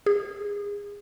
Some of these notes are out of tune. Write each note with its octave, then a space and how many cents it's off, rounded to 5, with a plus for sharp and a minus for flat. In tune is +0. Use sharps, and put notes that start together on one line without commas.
G#4 -30